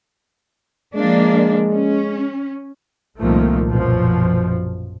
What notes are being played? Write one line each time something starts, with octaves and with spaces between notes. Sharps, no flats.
F3 G#3 A#3 D4
C#4
C2 A#2 D#3 F3 A3 A#3
A#1 F#2 B2 F3